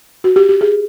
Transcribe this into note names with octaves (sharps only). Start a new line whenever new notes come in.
F#4
G4
G4
G#4